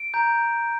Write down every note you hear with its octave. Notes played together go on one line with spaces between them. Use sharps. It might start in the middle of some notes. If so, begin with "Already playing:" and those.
Already playing: D7
A#5 G6